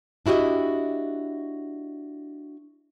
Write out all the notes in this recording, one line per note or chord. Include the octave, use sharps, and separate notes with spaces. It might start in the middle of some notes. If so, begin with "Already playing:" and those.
D4 E4 F#4 G4 D#5